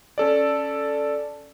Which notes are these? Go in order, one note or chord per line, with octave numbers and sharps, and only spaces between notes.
C#4 A4 D5